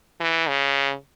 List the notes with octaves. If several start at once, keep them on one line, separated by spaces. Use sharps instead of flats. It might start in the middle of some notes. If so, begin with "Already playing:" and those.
E3
C#3